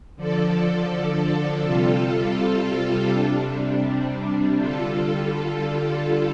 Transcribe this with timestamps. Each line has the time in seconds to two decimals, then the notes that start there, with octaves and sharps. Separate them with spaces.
0.16 D3 F3 D4 A4
1.63 C3 G3 F4 A4
3.10 C3 G3 D4
4.58 D3 G3 F4 A4